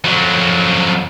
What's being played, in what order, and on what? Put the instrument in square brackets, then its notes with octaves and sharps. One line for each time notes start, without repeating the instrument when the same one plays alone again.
[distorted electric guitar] F2 F#3